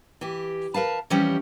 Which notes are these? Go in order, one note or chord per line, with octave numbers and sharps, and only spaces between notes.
E3 G4
A#4 B4 F5 A5
E3 F3 G3 C4 C#4 G4